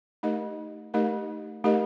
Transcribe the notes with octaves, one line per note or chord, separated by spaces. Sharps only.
A3 D#4 G4 A#4 D#5
A3 D#4 G4 A#4 D#5
A3 D#4 G4 A#4 D#5